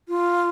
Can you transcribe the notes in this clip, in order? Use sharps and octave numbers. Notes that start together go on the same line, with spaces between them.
F4